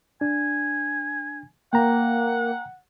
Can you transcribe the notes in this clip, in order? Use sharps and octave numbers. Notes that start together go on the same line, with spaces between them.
D4 G#5
A#3 F#5 G5 A#5